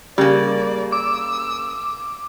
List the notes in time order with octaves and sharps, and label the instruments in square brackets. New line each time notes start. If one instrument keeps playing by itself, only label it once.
[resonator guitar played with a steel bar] C#3 A#3 [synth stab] G3 [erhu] D5
[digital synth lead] D6 [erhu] E6